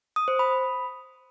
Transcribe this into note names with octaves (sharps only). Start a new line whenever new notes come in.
D#6
C5
B5